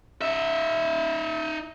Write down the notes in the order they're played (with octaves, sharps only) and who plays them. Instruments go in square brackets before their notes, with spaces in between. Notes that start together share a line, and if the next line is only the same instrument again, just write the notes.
[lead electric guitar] D#4 E5